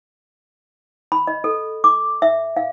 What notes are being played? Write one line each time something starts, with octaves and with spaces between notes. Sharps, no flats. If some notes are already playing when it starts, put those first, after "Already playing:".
B5
D#5
A4
D6
E5
F5